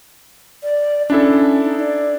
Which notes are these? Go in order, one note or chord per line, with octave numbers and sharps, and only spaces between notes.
D5
C#4 D4 E4 A4
D#4
D5